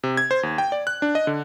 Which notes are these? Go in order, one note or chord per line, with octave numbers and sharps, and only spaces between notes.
C3
G#6
C5
D#2
G5
D5
F#6
D4
D#5
D3